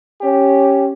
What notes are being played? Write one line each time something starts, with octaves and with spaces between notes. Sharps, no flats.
C#4 G4